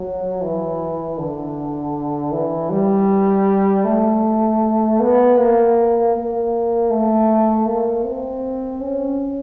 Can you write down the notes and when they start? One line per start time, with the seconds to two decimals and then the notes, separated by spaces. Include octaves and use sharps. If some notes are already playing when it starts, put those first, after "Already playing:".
Already playing: F#3
0.42 E3
1.18 D3
2.32 E3
2.70 G3
3.85 A3
5.00 B3
5.38 A#3
6.15 A#3
6.90 A3
7.66 A#3
8.05 C4
8.81 C#4